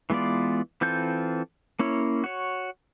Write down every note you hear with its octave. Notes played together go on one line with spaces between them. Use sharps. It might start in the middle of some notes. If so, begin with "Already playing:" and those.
E3 G#3 B3 F4 D5
E3 C4 F4 A4 G6
A#3 C#4 E4 C#5
F#4 C#5